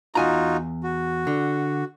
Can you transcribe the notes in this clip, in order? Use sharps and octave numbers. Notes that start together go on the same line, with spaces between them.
E2 D#4 F4 F#4 G#5 A#5
F#4
D3